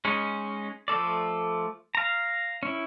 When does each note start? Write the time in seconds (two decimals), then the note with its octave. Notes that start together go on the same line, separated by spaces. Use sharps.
0.05 G#3 C#4 D#4
0.88 F3 A3 A4 D5
1.95 F5 A#5
2.63 C#4 E4